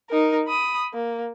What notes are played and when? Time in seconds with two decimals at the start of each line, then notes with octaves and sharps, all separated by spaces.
0.10 D#4 A#4
0.48 B5 D#6
0.94 A#3